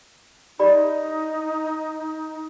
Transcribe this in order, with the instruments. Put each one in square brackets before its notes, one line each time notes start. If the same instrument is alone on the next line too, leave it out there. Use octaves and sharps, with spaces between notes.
[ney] D#4 [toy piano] G4 D5 B5